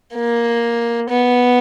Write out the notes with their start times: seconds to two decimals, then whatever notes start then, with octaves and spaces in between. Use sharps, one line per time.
0.15 A#3
1.10 B3